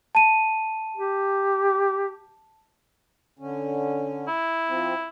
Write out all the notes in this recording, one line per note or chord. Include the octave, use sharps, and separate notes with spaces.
A5 D#7
G4
D3 C#4
E4
F3 C4